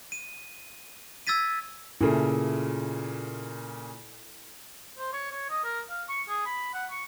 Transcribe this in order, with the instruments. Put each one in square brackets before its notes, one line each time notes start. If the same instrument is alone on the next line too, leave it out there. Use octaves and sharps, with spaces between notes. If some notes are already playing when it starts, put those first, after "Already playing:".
[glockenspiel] D#7
E6 G#6 A6 B6 D#7
[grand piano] A#2 C#3 [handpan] E4 A4
[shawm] C5
C#5
C#5
D#5
A#4
F5
C#6
G#4
B5
F#5
C#6